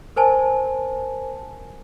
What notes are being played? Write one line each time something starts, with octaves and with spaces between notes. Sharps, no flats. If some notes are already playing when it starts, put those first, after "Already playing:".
A#4 C5 G#5 A5